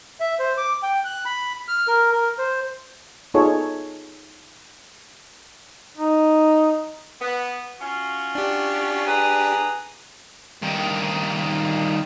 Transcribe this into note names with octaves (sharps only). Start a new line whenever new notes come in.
E5
C5
D6
G5
F#6
B5
F6
A#4
A#4
C5
B3 D#4 F4 G#4 A4 C#5
D#4
B3
C#4 F4 F#4
D4 G4
G#4 B4 A#5
G2 D#3